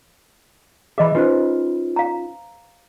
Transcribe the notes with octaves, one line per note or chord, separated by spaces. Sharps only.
E3 G#4 D#5 E5 B5
C#4 D#4 F4 B4 C5
F5 A#5